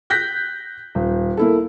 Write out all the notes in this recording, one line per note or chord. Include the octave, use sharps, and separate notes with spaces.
F#6 G6 A#6 B6
D#1
A#3 E4 A4